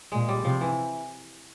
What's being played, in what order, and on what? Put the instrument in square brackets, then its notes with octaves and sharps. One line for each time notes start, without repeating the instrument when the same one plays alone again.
[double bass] A#2 [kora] G#3
[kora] G3
[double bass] C3 [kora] F3
[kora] E3